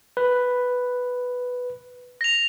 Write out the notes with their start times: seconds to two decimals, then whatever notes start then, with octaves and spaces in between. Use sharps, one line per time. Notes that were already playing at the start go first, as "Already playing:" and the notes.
0.17 B4
2.21 A#6 F7